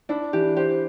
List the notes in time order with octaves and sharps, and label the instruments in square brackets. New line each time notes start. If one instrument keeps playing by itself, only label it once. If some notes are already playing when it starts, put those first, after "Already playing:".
[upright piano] D4 [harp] E4
[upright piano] E3 [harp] G4
[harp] G4 [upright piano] C5